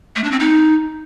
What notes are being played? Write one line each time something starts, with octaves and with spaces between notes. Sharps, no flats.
A3
D4
C4
D#4